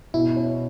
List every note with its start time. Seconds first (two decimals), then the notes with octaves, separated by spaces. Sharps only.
0.14 B2 E4
0.36 C#4